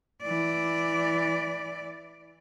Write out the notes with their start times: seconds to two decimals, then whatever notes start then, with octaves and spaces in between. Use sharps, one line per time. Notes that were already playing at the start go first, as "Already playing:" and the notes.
0.23 E3 D5